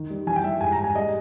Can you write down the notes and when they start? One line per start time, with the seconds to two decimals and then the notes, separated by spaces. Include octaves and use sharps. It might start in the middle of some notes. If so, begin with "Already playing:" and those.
Already playing: D#3
0.10 G3
0.27 E3 G#5
0.36 G5
0.44 G3 E5
0.61 G#2 G#5
0.72 A#5
0.78 G#2
0.84 G#5
0.95 G3 D#5